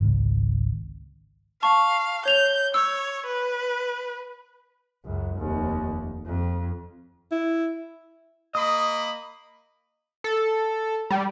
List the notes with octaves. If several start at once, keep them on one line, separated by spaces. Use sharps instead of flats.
G#1 C#2
F5 A5 C#6
C#5 G6 F7 G7
C#5 E6
B4
C#2 F#2
F1 D#2
F2
E4
A#3 D#5 B5 D#6
A4
G3